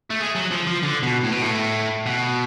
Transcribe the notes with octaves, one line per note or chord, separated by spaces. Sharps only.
A3
G#3
F#3
F3
F3
D3
B2
A2
B2
A2
B2